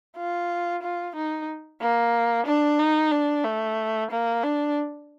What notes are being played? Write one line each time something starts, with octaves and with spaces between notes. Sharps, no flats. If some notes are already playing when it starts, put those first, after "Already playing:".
F4
F4
D#4
A#3
D4
D#4
D4
A3
A#3
D4